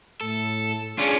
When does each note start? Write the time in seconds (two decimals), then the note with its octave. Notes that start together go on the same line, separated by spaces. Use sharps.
0.21 A2 A4
0.98 C#4 D4 F4 G#4